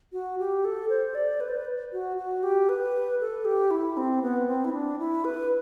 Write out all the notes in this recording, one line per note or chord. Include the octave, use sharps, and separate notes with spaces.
F#4
G4
A4
C5
D5
B4
C5
B4
F#4
F#4
G4
B4
A4
G4
E4
C4
B3
C4
E4
D4
E4
B4